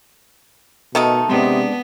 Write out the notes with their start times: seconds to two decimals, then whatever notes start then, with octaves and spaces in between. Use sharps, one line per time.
0.95 B2 D#3 A3 D#4 A4
1.29 C3 G#3 B3 C4 D4